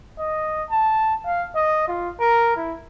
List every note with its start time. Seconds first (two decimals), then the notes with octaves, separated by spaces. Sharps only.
0.19 D#5
0.70 A5
1.26 F5
1.56 D#5
1.88 F4
2.20 A#4
2.56 E4